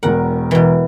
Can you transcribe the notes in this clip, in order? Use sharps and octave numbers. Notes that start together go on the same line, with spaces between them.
E1 E2 A#4 F#5
B2 E3